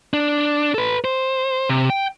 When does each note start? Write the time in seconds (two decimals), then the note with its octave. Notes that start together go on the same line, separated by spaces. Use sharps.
0.13 D4
0.74 A4 B4
1.05 C5
1.69 C3
1.90 G5